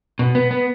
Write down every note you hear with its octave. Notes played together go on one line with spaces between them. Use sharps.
B2
B3
B3